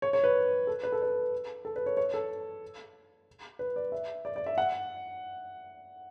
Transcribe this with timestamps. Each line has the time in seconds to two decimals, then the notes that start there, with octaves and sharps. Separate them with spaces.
0.02 C#5
0.13 C#5
0.24 B4
0.67 A4
0.83 B4
0.92 A4
1.02 B4
1.65 A4
1.76 B4
1.86 C#5
1.97 C#5
2.14 A4
3.59 B4
3.76 D5
3.92 E5
4.25 D5
4.36 D5
4.46 E5
4.58 F#5